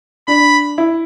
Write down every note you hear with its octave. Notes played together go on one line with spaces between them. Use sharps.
D4 B5
E4